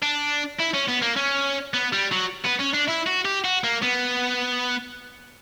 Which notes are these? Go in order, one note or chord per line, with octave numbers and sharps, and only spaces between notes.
D4
E4
C#4
B3
A#3
C#4
B3
G3
F#3
B3
C#4
D4
E4
F#4
G4
F#4
A#3
B3